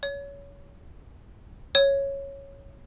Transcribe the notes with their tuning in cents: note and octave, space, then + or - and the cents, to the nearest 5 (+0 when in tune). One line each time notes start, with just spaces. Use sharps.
C#5 +25
C#5 -5